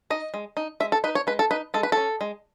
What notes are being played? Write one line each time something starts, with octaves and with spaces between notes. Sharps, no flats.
D#4 D#5
G#3
D#4
G#3 E5
A4
D#4 B4
C#5
G#3 B4
A4
D#4 B4
G#3 A4
B4
C#4 A4
G#3